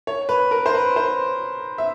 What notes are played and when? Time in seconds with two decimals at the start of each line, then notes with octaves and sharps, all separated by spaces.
0.07 C#5
0.29 B4
0.51 A#4
0.66 C5
0.74 B4
0.96 C5
1.78 E5